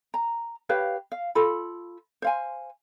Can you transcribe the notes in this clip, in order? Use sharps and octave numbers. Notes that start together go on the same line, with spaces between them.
A#5
G4 B4 C#5 F5
F5
F4 A4 B5
C5 F5 G#5